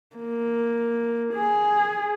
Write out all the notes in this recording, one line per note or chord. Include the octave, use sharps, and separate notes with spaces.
A#3
G#4